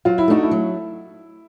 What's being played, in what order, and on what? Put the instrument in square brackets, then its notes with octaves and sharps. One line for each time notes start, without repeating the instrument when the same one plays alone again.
[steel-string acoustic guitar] F#3 [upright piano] F4
[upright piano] E4
[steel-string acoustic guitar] A3 D4 F#4 [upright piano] D#4
[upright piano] E4
[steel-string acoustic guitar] F#3